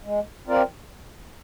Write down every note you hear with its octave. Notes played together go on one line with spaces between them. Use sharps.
G#3
C4 F4 A#4 D5